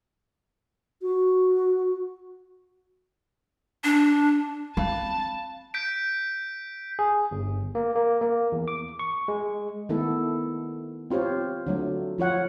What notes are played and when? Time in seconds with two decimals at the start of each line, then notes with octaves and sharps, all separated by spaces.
1.02 F#4
3.84 D4
4.77 C4 F5 A5 B5
5.74 G6 B6 D7
6.99 G#4
7.31 G1
7.75 A#3
7.96 A#3
8.21 A#3
8.52 E2
8.68 D6
8.99 C#6
9.28 G#3
9.89 D#3 A3 B3 E4 A4
11.10 C4 F4 G4 C5 C#5
11.66 D3 F#3 A3
12.18 F3 F4 C#5 F#5